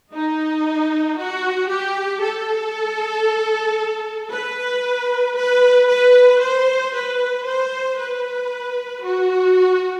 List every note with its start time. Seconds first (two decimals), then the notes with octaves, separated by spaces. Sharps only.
0.13 D#4
1.18 F#4
1.70 G4
2.22 A4
4.32 B4
5.37 B4
5.89 B4
6.42 C5
6.94 B4
7.46 C5
7.98 B4
9.03 F#4